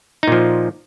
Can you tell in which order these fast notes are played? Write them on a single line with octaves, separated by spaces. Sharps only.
D#4 A#2 F3